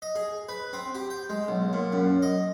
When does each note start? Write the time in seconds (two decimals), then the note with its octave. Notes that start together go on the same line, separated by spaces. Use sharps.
0.02 D#5
0.15 G#4
0.49 B4
0.73 C4
0.95 G4
1.10 G5
1.30 G#3
1.48 B1
1.73 A#2
1.93 F#2
2.22 D#5